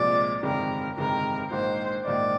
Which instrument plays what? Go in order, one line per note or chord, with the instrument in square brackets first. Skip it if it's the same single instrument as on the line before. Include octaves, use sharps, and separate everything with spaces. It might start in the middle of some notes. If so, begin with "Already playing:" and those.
Already playing: [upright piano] C2 A#2 F3 G#3 [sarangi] D5
[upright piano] G1 F2 C3 D#3 G#3 [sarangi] A#4
[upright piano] G1 F2 C3 D#3 G#3 [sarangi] A#4
[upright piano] A#1 G#2 D#3 A#3 D#4 [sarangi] C5
[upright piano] A#1 G#2 D#3 A#3 D#4 [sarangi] D5